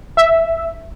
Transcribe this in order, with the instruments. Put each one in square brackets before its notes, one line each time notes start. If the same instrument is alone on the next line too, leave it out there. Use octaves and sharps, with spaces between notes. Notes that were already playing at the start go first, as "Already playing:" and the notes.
[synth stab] E5